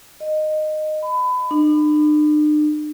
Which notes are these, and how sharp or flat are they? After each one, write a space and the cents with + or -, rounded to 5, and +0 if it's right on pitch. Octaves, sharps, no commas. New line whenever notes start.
D#5 -15
B5 +25
D4 +45